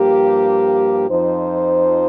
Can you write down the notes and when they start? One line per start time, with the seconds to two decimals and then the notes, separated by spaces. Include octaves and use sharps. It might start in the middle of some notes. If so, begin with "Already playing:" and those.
Already playing: G2 F3 A#3 G4
1.08 F2 F3 D#4 C5